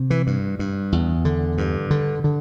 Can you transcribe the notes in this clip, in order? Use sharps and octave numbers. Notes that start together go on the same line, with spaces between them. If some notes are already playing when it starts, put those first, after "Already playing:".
Already playing: C3
E3
G2
G2
E2
D3
G2
D3
D3